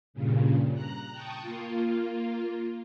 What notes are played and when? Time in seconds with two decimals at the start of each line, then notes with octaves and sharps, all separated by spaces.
0.14 G2 A#2 C#3
0.74 A#5 F#6
1.12 G5 A5 C#6 D#6
1.42 A#3 F4